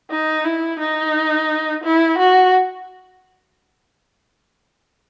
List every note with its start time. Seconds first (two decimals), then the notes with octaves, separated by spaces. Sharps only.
0.10 D#4
0.44 E4
0.80 D#4
1.83 E4
2.18 F#4